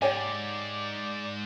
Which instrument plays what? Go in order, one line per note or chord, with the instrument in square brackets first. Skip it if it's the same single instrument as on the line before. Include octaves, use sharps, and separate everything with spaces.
[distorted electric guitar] G#2 [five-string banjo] G4 C#5 G#5 [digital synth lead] D5